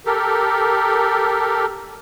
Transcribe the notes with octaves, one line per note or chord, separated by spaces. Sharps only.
G4 A4 A#4